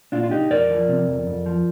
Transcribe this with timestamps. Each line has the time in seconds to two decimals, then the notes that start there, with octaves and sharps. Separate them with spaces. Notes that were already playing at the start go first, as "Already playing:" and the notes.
0.12 A#2 D4 F4
0.24 F4
0.31 C2 D#4 G4
0.50 F2 A#4 D5
0.70 F3
0.89 C3
1.07 F2
1.27 F2
1.46 F3